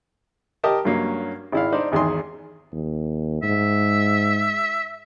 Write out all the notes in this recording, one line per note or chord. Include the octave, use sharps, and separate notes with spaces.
G4 A#4 D#5 G5 A5
G2 F#3 A#3 C#4
G#1 E4 F5
D4 D#4 C5 D5
G#1 E2 D#3 G#4 C6
D#2
G#2 E5